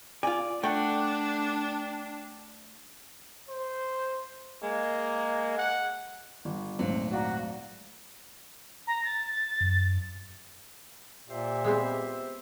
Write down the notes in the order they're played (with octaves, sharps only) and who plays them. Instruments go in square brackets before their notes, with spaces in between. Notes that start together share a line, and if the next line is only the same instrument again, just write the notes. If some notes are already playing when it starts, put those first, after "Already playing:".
[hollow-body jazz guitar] F4 G#5 [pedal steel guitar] D5
[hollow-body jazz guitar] A3 [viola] D4 [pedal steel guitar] D5 F#5 G5
[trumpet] C5
[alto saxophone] G#3 [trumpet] A#3
[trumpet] F#5
[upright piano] G1
[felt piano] G#1 D2 [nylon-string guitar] A#2 F#3 [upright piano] C4
[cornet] F#4 [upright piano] D5 F5 A#5
[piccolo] A#5
A6
[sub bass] F#2
[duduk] A#2 [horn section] G4 C5 E5
[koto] G#3 B3 C4